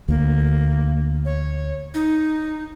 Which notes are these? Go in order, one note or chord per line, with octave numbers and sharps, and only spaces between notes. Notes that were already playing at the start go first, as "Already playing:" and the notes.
D2 A#3
C#5
D#4